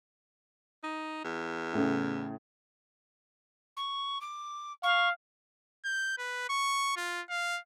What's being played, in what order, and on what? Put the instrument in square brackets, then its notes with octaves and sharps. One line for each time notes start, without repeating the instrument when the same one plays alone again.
[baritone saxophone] D#4
E2
[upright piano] A2 C#3
[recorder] C#6
D6
[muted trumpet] F5 [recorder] C#6
[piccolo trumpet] G6
B4
C#6
F4
F5